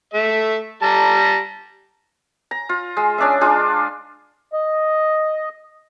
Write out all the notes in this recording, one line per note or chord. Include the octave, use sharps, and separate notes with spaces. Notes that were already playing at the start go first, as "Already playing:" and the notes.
A3 E5
G3 A5 A#5
A#5
F4
G#3
C#4 D4 D#5 E5
G#3 D4 F4
D#5